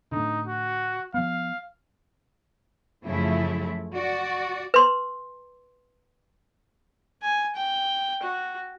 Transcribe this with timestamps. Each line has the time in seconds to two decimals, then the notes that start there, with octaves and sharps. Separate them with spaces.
0.12 A2 D3 D#4
0.47 F#4
1.14 F3 B3 F5
3.05 F#2 C#3 F3 A3 E4
3.94 F#4 D5
4.74 B4 C6
7.23 G#5
7.56 G5
8.23 F#4